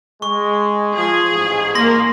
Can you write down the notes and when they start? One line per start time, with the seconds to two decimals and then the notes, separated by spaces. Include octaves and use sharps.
0.22 G#3 C#6
0.96 F3 G#4
1.31 A1 G#2
1.75 A#3 C6 A#6